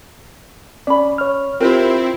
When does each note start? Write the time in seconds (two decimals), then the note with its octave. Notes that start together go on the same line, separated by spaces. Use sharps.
0.87 C#4 D5 B5
1.18 C#5 F6
1.61 C4 E4 F4 G4 A#4 C5